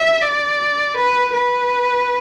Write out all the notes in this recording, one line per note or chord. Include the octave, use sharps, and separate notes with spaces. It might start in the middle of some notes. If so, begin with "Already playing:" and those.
Already playing: E5
D5
B4
B4